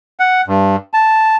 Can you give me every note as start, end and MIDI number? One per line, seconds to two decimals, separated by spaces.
0.20 0.41 78
0.47 0.76 43
0.94 1.37 81